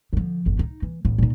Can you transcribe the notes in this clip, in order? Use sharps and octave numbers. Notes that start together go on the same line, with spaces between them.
D3 F3
G1 F2
D#4
E3
A1
A#2 D#4